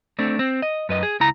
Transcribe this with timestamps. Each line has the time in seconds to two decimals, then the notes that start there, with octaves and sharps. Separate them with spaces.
0.19 A3 C4 D4
0.39 C4
0.62 D#5
0.89 F#2 B4 D#5
1.03 G#4
1.20 C#2 E4 A#5